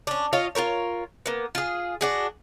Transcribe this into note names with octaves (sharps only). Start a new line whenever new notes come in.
C#4 D4
F4 C#5 D#5 F5
F4 F#4 A#4 C#5
A#3 B3
F4 G#4
D4 F#4 G#4